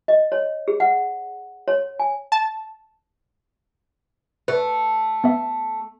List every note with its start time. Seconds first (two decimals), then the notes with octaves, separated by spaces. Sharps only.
0.08 D#5
0.32 C#5
0.68 G#4
0.80 F#5
1.68 C#5
1.99 G#5
2.32 A5
4.48 A3 B4
5.24 B3 E5